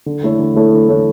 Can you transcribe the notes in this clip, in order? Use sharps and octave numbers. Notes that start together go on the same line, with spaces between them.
D3
A3 E4 A4 C#5
D3
A3 E4 A4 C#5
D3
A3 E4 A4 C#5